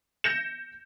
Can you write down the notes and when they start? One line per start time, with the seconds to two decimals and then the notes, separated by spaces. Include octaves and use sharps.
0.24 G6 A#6 C#7 E7